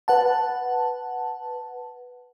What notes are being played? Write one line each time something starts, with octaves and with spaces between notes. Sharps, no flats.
B4 F#5 A5